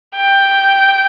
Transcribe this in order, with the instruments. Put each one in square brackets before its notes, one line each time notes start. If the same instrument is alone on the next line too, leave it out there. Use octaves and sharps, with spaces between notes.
[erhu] G5